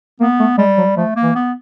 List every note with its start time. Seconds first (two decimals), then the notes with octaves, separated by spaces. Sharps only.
0.20 A#3 B3
0.40 A3
0.58 G3 G#3
0.77 F#3
0.97 F3 A3
1.16 A#3
1.23 E3
1.35 B3